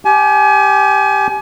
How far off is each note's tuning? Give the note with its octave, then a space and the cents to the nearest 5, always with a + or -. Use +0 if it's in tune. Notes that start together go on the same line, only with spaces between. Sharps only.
G4 +0 G#5 +30